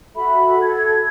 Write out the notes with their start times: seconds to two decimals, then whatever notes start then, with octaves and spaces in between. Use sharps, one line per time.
0.16 F#4 A4 E5 B5
0.60 A4 G#6